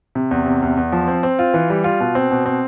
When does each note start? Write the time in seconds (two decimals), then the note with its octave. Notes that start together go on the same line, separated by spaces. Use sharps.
0.15 C3
0.31 E2
0.46 C3
0.62 E2
0.77 E2
0.92 F3
1.08 C4
1.23 C4
1.39 F4
1.54 E3
1.70 G3
1.84 F4
2.00 B2
2.15 C4
2.31 B2
2.46 C4